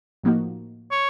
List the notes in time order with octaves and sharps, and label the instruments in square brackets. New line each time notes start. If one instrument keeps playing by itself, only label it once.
[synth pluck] A2 F3 A#3 D#4 F#4
[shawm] C#5